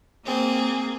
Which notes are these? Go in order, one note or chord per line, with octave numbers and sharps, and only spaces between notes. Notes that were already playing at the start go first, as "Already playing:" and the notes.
A#3 C4 G#4